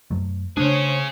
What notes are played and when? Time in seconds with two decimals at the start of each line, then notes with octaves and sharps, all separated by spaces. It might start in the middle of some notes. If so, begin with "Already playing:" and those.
0.11 F#2 F#3 A3
0.57 C#3 A3 C#4 D4 G#4 C5 C#5